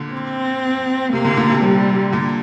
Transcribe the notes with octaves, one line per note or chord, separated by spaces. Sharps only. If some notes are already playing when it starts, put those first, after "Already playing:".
Already playing: A#2 D3
C4
C3 A#3
A#2 D3
A#2 D3
C3
C3 G3
A#2 D3